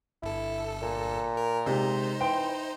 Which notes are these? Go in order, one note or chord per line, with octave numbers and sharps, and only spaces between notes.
G1 E4 A4
A#2
A#4
C3 G#3 D#4 C5
E3 G5 C6